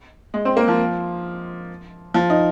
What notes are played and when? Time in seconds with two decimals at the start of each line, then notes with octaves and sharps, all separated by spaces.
0.34 G#3
0.45 C4
0.57 A#3
0.68 F3
2.14 F3
2.30 D#4